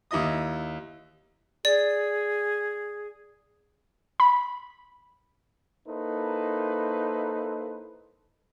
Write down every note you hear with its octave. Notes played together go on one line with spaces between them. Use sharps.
D#2 E4 D#5 D#6
G#4 D5
B5
A#3 D#4 E4 A4 B4 C5